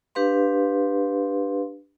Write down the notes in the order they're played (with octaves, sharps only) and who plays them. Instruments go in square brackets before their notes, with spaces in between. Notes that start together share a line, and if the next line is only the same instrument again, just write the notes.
[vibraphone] D4 G4 B4 F5 C6